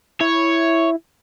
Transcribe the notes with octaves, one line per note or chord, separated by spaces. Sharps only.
E4 C#5